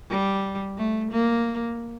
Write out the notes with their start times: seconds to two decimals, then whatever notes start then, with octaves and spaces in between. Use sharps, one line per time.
0.10 G3
0.78 A3
1.12 A#3